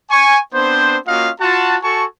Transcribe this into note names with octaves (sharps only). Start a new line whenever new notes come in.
G#5 C#6
B3 C4 D4 C5
A#3 C#4 F4 F#4 D#5 F5
F4 F#4 A5
F#4 A4 G#5 A5 C#6